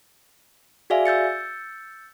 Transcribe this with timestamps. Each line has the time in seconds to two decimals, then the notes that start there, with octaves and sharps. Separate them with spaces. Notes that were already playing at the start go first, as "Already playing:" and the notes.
0.90 F#4 G#4 D5 E5 F5 G#5
1.06 E6 G6 A6 C#7